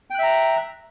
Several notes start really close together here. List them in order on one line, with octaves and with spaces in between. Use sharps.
G5 F#6 E5 A#5